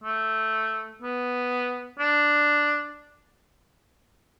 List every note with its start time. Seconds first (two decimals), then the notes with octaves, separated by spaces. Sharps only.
0.03 A3
1.02 B3
1.99 D4